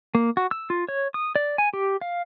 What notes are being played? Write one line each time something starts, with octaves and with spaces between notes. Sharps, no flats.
A#3
F#4
E6
F4
C#5
D#6
D5
G#5
G4
F5